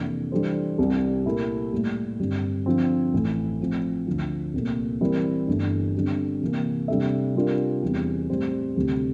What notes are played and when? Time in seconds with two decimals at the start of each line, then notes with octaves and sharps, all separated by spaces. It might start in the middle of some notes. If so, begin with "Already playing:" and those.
Already playing: F2 C3 E3 A#3 D4
0.32 E3 G3 D4 A4 C5
0.78 C2 C3 G3
1.25 A#2 A3 E4 G4 A#4
1.73 A2 G3 A#3
2.19 G2 D3 G3 C4
2.66 D3 F3 C4
3.13 A1 A2 E3 A3
3.60 A2 F3 C4
4.07 D2 D3 F3
4.53 C2 A#2 A3
5.01 E3 G3 C4 E4 A#4
5.48 G1 G2 E3 A3 D4
5.95 D3 G3 C4
6.42 C3 E3 A#3
6.88 C3 G3 D4 A4 E5
7.35 C3 G3 D4 F4 A#4
7.82 E2 E3 G3 C4
8.30 A2 G3 C4 G4 C5
8.76 D2 C3 G3 C4 G4